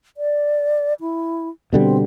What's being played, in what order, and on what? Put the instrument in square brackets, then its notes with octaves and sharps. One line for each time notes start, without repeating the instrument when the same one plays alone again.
[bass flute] D5
E4
[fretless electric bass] B2 D3 G3 [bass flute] C4